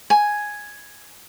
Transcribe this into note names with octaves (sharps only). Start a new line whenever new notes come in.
G#5